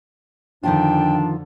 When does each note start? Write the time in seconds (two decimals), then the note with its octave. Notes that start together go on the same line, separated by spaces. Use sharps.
0.63 F2 D3 D#3 F3 D4 F4 G5